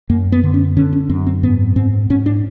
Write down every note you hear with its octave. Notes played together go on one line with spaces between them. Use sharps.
F#2 A#3
B3
D3
C#4
D3 C#4
C#4
F#2 C4
C4
G#2 B3
G#2 C4
G#2 C#4
D4